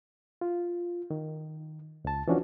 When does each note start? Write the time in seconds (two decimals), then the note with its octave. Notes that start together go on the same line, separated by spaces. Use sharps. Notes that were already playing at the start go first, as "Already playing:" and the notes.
0.41 F4
1.11 D#3
2.05 C#2 A5
2.28 E3 F3 C#4 D4 F#4